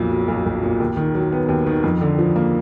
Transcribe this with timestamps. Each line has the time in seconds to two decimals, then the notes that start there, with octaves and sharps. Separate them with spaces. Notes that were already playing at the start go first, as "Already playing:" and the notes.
Already playing: B1 F2 A#2
0.11 F#3
0.28 B1
0.46 B1
0.63 A#2
0.80 D#2
0.97 D#3
1.15 F#3
1.32 B3
1.49 D#2
1.66 D#3
1.84 F2
2.01 D3
2.19 F3
2.36 A#3